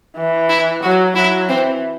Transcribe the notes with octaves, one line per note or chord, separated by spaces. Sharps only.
E3
E4
F#3 F#4
F#3 E4
E3 C4